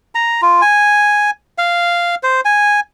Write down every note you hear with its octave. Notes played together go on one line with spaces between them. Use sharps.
A#5
F4
G#5
F5
C5
G#5